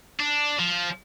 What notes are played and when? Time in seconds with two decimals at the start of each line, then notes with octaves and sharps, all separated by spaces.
0.20 D4
0.59 F3